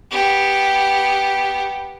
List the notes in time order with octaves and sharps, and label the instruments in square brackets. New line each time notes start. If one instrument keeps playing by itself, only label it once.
[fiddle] B3 G4